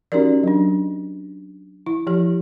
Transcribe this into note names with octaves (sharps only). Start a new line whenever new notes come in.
C#4 D#4 F#4 G4 A#4 D5
F#3 D4
E4
F3 G4